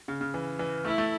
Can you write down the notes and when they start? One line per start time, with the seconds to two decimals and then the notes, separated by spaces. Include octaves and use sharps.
0.08 C#3
0.21 C#3
0.34 E3
0.59 E3
0.85 A3 E4
0.98 A3